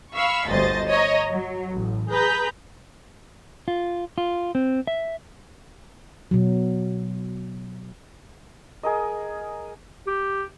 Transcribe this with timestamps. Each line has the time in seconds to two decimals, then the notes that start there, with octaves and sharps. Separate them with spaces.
0.16 F5 B5 C#6 E6
0.49 G1 D2 C5 D#5 A6
0.88 C#5 D#5 A#5
1.31 F#3
1.71 A1
2.12 G#4 B4 A#5 G6
3.68 F4
4.18 F4
4.55 C4
4.87 E5
6.31 B2 F#3
8.83 G#4 A#4 D#5
10.07 G4